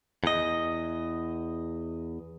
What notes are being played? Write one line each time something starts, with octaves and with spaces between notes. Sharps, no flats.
E2 D#5